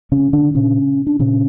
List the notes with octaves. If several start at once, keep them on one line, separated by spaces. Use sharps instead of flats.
C#3 C#4
D3 D4
A#2 C#3 C#4
D4
A#2 C#3 C#4